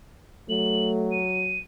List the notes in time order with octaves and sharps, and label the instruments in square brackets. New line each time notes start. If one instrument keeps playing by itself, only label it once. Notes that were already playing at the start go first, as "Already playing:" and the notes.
[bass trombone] F#3 [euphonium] A3 [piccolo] F#7
[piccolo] D#7